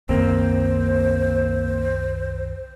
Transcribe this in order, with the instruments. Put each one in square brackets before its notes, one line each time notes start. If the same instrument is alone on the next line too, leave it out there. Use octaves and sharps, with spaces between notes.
[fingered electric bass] C2 F#2 D#3 [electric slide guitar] A#3 C4 [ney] C5